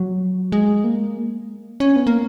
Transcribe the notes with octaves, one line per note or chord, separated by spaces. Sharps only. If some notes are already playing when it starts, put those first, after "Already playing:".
Already playing: F#3
G#3
A#3
C#4
B3
A#3